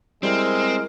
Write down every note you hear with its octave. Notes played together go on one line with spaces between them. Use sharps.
G3 G#3 C4 E4 A#4